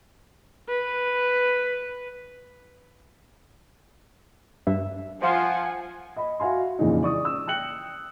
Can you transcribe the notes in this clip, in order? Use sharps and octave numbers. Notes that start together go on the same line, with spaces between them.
B4
G2 E5
F3 C5 F5 F#5 G#5 C6
D#5 B5
F#4 E5 F5 G#5 C6
F2 A#2 C#3 E3 G#3 D#4
D5 C#6 D#6
E6
G5 F#6 C#7 F#7